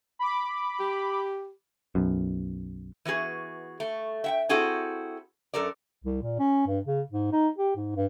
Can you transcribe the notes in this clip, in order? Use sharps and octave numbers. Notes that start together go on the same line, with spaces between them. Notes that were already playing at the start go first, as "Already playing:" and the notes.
B5 D6
G4
B1 F#2
E3 B3 F#4 G#4
A3
E5 F#5 G5
C4 E4 F#4 G#4 A4
F#2 A4 A#4 D5
C2
A#2
C#4
G2
C#3
G#2
D#4
G4
G#2
G2